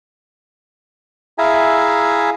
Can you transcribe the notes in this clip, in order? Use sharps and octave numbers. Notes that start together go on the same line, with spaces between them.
E4 G#4 E5 F5 G#5 A#5